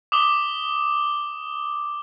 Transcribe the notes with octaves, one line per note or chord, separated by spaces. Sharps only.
D6 D#6 G7